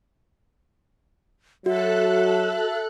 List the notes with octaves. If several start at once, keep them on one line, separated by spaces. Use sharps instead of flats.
F#3 F#4 A4 E5 F#6